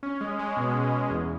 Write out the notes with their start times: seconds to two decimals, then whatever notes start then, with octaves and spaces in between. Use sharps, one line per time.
0.03 C#4
0.21 G#3
0.39 G#3
0.57 B2
0.75 B2
0.93 B2
1.11 E2